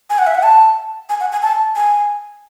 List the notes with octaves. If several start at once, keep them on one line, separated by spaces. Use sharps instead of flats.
G#5
F#5
E5
F#5
A5
G#5
F#5
G#5
A5
G#5